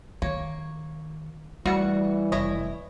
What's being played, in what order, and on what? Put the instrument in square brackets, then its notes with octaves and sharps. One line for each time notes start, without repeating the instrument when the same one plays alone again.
[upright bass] D#3 [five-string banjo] A#3 C#5
[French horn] E3 [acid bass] G3 [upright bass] A3 [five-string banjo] F#4 F#5
[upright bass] F1 [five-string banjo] E4 C#5 D#5